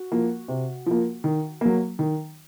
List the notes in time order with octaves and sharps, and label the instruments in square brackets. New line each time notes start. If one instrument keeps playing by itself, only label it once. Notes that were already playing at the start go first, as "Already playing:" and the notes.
Already playing: [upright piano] F#4
F3 A#3
C3
F3 A#3
D#3
F#3 A#3
D#3